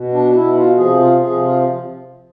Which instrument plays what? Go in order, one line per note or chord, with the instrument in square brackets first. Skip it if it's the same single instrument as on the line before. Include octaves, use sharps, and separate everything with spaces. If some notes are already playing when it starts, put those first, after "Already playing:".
Already playing: [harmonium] B2
D4
B2 E4
F4
C3 F3 G#4
F4
C3 F3 G#4
F4